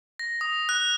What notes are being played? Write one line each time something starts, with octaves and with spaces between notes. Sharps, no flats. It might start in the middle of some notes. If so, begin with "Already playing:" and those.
A#6
D#6
F#6